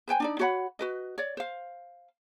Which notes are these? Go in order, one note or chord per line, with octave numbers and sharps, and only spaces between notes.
B4 C5 G5 G#5
D4 D#4 D5
F#4 C#5 F#5 B5
F#4 B4 D#5
C#5 D5
C5 F5